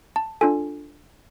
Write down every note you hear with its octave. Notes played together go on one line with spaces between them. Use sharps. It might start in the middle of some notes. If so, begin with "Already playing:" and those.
A5
D4 F4 A4 G#5